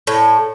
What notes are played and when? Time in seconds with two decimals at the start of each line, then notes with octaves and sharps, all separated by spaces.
0.07 A2